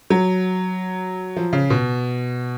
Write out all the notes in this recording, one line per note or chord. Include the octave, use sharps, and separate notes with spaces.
F#3
F3
C#3
B2